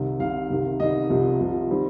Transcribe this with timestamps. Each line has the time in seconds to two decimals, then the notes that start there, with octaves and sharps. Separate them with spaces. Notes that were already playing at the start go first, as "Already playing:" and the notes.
Already playing: C2 C3 D#3
0.19 C2 C3 D#3 F5
0.50 C2 C3 D#3
0.80 C2 C3 D#3 D#5
1.10 C2 C3 F3
1.40 C2 C3 F3
1.71 D#3 G3 C4